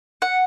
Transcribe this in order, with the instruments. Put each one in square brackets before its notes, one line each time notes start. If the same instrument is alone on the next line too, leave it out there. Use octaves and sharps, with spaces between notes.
[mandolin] F#5